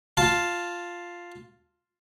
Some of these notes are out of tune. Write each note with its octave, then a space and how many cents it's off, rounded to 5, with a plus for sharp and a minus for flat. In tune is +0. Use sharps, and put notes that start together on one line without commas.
F4 +0 A5 +0